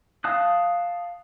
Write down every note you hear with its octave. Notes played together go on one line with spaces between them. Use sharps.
F5 A5 D#6 F#6